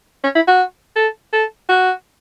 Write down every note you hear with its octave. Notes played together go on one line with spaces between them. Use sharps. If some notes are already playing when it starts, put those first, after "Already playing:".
C#4
E4
F#4
A4
A4
F#4